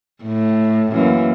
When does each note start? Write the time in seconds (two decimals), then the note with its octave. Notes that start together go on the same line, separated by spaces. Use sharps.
0.23 A2
0.91 F#2 E3 A#3